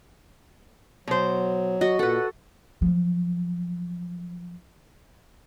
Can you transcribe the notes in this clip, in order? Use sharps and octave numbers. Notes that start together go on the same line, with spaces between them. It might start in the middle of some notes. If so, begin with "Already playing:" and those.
B2 F#3 C5
F#4 D#5
A#2 A4 B4 F#5
F3 F#3